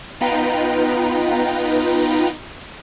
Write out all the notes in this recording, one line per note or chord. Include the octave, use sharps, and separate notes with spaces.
B3 D#4 F4 B4 G5 A#5